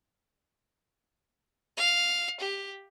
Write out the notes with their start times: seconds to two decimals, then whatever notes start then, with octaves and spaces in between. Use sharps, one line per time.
1.77 F5
2.40 G4